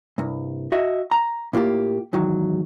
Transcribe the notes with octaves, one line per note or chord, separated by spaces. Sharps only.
C2 G2
F#4 D#5 E5
A#5
A2 A#3 F4 G4
E2 G#2 D#3 F#3